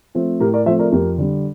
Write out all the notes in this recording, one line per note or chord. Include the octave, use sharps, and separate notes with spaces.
F3 A3 C4
A2 G4 A#4
A#4 D5
F3 A3 C4 C5 E5
A#4 D5
F2 G4 A#4
D3 G3